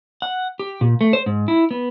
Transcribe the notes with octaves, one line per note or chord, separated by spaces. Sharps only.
F#5
G4
A#2
A3
C5
G#2
E4
B3